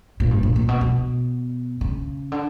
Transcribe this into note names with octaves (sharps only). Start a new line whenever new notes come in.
A#2
G2
A#2
A#2
B2
B2
C#3
D3